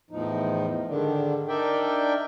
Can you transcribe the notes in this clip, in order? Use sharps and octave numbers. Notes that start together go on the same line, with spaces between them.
E2 A2 F3 D#4
G#2 D3 D#3 D4
D4 D#4 A#4 D5 E5 G5